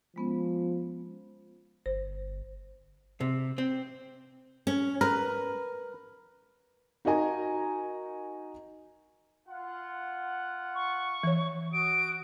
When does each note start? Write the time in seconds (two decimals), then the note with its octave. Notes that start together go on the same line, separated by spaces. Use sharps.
0.16 F3 G#3 B3 C#4
1.86 G1 C5
3.21 C3
3.58 C4
4.67 C#4
5.01 A#4 B4
7.05 D#4 F#4 A#4 D#5 G#5 A#5
9.48 F4 F#5
10.75 C#6
11.23 E3 C#5
11.73 F#4 D#6 D7